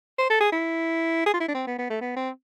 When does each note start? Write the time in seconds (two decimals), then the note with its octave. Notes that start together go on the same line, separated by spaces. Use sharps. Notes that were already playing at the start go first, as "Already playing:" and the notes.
0.18 C5
0.30 A4
0.40 G#4
0.52 E4
1.26 G#4
1.34 F4
1.40 E4
1.48 D4
1.55 C4
1.67 B3
1.78 B3
1.90 A3
2.01 B3
2.16 C4